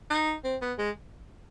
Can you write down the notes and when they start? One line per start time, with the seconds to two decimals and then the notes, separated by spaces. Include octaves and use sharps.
0.10 D#4
0.45 C4
0.62 B3
0.78 G#3